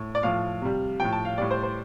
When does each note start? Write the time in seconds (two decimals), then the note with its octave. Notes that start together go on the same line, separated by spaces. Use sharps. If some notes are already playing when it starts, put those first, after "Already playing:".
Already playing: A2
0.15 D5
0.23 A2 F3 F5
0.62 C3 G3
1.00 A2 F3 G5
1.13 A5
1.25 F5
1.38 A2 G3 D5
1.51 C5
1.63 C5